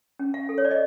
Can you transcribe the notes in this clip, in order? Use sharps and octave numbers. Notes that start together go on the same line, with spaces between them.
C#4
F5
A4
C#5
D5
D#5